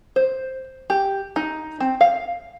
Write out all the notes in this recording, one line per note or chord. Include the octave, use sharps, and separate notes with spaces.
C5
G4
D#4
C4
F5